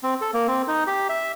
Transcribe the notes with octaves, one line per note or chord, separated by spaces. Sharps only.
C4
A4
A#3
C4
D#4
G4
E5